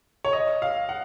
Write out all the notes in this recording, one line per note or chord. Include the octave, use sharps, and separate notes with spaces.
C#5
D#5
F5
F#5